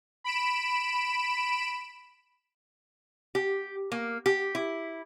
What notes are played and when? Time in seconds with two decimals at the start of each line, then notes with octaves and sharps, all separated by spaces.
0.24 B5 D7 E7
3.35 G4
3.92 A#3
4.26 G4
4.55 E4